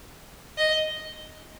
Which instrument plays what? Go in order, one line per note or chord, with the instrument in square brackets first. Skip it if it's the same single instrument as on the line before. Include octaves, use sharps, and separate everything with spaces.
[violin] D#5